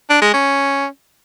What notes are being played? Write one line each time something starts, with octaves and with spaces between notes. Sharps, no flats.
D4
G#3
C#4